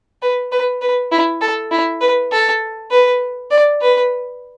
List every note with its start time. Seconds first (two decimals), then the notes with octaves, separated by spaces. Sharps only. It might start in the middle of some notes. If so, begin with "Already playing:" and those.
0.22 B4
0.52 B4
0.82 B4
1.12 E4
1.41 A4
1.71 E4
2.01 B4
2.32 A4
2.91 B4
3.51 D5
3.81 B4